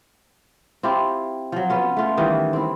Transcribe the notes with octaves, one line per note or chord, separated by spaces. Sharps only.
C4 E4 F4 G4
F3 F#3
B3 C#4 F4
A3 F4
D#3 E3 G3
C4 E4